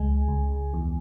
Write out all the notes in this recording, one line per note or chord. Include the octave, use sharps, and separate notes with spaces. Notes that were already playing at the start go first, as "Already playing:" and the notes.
Already playing: C#2 G#3 G#5
C#2
E2